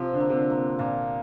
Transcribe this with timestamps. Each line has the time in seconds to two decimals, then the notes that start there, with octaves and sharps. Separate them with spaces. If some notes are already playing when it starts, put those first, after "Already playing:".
Already playing: C3 F3
0.13 D3
0.20 A#3
0.30 C3
0.36 D3
0.50 A#3
0.57 C3
0.79 A#2 A#3